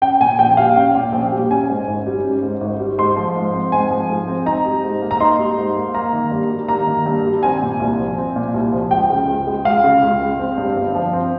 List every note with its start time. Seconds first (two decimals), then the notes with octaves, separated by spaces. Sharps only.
0.02 C#4 G5
0.20 A#2 G#5
0.39 A#1 G5
0.57 G3 F5
0.76 C#4 G5
0.95 A#2
1.12 A#1
1.32 G3
1.50 C#4 G#5
1.69 G#2
1.87 G#1
2.06 G3
2.24 C#4
2.43 G#2
2.61 G#1
2.79 G3
2.98 G#2 C6
3.16 F3
3.36 G#2
3.54 C4
3.72 G#2 G#5
3.91 F3
4.09 G#2
4.28 C4
4.46 D#4 A#5
4.65 G3
4.84 G#2
5.02 A#3
5.11 A#5
5.20 D#4 C6
5.39 G3
5.58 G#2
5.76 A#3
5.94 A#3 A#5
6.13 D#3
6.31 G2
6.50 G3
6.68 A#3 A#5
6.87 D#3
7.06 G2
7.25 G3
7.43 C4 G#5
7.62 A#2
7.80 C2
7.98 F3
8.17 C4
8.36 A#2
8.54 C2
8.72 F3
8.91 C#2 G5
9.10 C#3
9.28 C#2
9.47 G#3
9.65 C#2 F5
9.84 C#3
10.03 C#2
10.21 G#3
10.39 C4
10.58 G2
10.76 G1
10.95 F3
11.13 C4